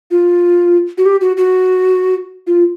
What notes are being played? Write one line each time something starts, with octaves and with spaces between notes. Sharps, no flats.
F4
F#4
G4
F#4
F#4
F4